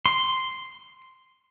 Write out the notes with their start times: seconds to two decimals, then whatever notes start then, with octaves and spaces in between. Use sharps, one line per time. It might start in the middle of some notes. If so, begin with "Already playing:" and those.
0.06 C6